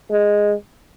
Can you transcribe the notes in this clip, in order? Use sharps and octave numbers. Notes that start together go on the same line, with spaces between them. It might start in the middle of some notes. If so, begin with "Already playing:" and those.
G#3